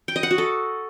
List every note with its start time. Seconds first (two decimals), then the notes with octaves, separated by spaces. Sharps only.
0.08 G5
0.16 D#5
0.23 F#5
0.31 F#4
0.38 A4